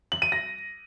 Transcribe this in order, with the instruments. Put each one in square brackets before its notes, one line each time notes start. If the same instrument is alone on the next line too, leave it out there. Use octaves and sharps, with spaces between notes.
[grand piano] F#7
D#7
A#6